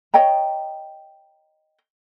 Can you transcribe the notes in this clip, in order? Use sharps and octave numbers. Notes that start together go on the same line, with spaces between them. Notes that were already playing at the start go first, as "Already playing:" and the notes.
C#5 D#5 G5 A#5